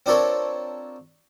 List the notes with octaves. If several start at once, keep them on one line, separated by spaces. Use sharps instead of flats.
C4 D4 F4 A4 A#4 C#5